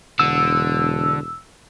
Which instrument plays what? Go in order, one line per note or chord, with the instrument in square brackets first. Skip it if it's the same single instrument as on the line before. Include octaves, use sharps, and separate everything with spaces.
[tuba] E1 [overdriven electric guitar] D3 [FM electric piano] E6